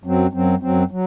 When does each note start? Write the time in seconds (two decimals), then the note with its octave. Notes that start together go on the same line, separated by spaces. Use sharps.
0.04 F#2 F#3 C4
0.33 F#2 F#3 C4
0.61 F#2 F#3 C4
0.91 F#3